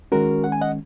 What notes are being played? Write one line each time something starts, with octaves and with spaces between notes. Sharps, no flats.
D#3 G#3 C#4 F#4 A#4
F#5
G#5
D#5 F#5